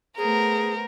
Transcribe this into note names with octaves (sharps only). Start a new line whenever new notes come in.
A3 B3 G#4 A#4 C5